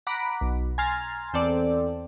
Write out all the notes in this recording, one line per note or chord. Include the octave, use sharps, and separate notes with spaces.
F#5 A#5 B5 D6
B1
G#5 A#5 C6 F6 A6
E2 C4 A4 D5